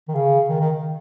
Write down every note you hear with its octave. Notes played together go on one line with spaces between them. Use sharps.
D#3
C#3
D#3
D#3